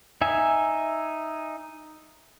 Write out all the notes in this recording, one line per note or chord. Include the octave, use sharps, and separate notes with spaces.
D#4 E5 G#5